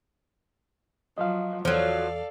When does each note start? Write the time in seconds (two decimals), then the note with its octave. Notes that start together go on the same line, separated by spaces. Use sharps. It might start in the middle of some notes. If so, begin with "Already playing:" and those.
1.18 F3 F#3 D#5 F5
1.65 E2 F3 F#3 A4 D5 F5